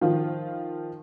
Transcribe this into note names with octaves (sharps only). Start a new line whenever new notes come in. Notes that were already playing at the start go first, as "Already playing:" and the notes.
D#3 F3 F4